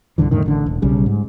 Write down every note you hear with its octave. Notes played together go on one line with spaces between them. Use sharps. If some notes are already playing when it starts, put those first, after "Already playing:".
C2 G2 D3 E3
F2 A2 D3 D#3
A1 D3
E1
B1 C#3 G3
G#2